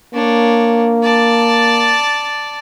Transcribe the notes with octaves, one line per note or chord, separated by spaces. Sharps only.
A#3 D4 C#5
D5 A5